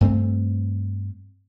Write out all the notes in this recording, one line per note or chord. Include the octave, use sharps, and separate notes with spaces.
G2 A3 C4